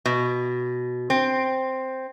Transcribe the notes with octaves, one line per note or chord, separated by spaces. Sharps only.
B2
C4